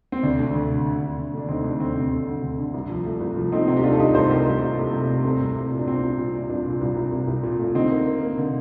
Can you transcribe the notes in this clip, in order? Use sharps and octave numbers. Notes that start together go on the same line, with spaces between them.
C4
D2 D4
A3
D2
D3
D3
D2
D3
A3 D4
D2 C4 D#4
A3 D4
D2 C4
D2 C4
A3
D3
D2
D3
C2
F3
A3
C2
F3
A3 C4 D#4
C3 C4 D#4
G4
A3 D4 F4
A4
C2 D#4 G4
C2 A4 C5
A3 G4 A#4
C2
C2
A3
C3
A3
C2 C4
C2
C2
A#2
D4
C2 C4
C2
A#2
A#2
C2 D4
A#2
C2
C2
C2
C2
A#2
A3
D3 C4 D#4
A#3
A#3
A#3
D3